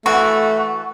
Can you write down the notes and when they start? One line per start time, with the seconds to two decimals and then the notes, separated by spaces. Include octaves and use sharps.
0.06 E3 A3 F#4